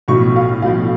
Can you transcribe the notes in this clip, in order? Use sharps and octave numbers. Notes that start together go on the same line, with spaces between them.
B1 A2 F3 C#6
F5
B1 A2 F3 F5